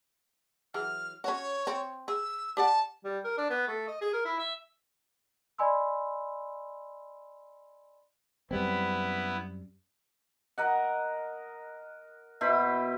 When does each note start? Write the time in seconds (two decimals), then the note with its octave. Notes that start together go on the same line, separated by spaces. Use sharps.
0.74 E3 F#3 G#4 F6
1.24 C#4 F#4 C#5
1.67 C4
2.08 G#4 E6
2.57 G4 D5 F#5 A5
3.04 G3
3.24 A#4
3.38 D4
3.50 B3
3.68 A3
3.88 D#5
4.02 G#4
4.13 A#4
4.25 E4
4.39 E5
5.58 D5 D#5 G#5 B5 C6 E6
8.51 F#2 G3 B3 C4 E4
10.58 A#4 D#5 F#5
12.41 B2 E4 C5 B5